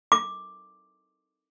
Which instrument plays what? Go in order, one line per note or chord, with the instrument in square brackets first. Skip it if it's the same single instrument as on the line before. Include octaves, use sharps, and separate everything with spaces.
[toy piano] D6